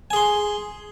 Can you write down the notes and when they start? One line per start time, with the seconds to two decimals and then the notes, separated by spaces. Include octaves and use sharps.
0.11 G#5
0.13 G#4
0.16 C6